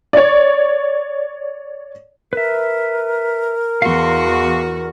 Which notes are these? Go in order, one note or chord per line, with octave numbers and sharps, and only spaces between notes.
C#5 D5
A#4 B4 E5
E2 F#4 F5 C6